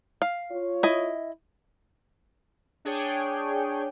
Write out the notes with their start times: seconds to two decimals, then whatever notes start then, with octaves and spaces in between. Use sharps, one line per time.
0.22 F5
0.51 F4 C#5
0.83 E4 D#5
2.85 D4 G#4 C#5 G5